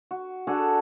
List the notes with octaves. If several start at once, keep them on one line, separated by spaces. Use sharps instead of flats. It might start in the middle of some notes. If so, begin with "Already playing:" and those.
F#4
D4 F#4 G#4 A4